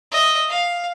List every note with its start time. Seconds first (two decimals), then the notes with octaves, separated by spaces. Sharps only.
0.11 D#5 E5
0.49 F5